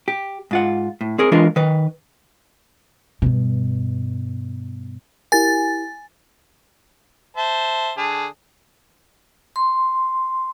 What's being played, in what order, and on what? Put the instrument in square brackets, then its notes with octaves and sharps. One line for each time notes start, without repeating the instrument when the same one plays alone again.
[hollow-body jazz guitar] G4
G#2 F4 F#5
A2
C4 G#4 A#4
E3 G#3 D4 F4 A#4 D#5
D#3 B4
[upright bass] G2 B2
[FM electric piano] E4 G4 A#4 [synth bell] G#5 A6
[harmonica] C5 E5 A5
D3 G#4 A5
[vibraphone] C6